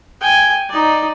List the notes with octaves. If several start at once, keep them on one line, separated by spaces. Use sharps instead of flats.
G5 G#5
D#4 D5